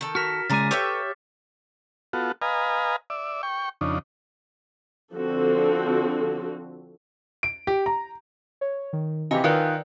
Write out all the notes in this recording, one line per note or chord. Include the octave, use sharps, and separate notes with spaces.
D#3 A4
F#4 A#4 F6 B6 E7
A#2 C#3 G#3 G#5 A#5 D6 A6
G4 A4 B4 C#5 E5 C#6 D6
B3 F4 F#4 A4
B4 D#5 F5 G#5 A#5
D5 E5
G5 C#6
F2 C#3 D4 D#4
D3 F3 C4 F#4 A4
D7
G4
A#5
C#5
D#3
C3 E3 G4 D#5 F5 G#5
D#3 F4 A#4 B4 D5 F#6